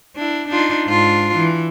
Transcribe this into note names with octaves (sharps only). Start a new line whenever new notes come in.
D4 E4
D4 D#4 F4
G#2 D4 F4
E3